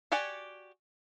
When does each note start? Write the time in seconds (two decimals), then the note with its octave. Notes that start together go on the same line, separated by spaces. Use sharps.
0.12 F#4 G4 D5 F#5 G#5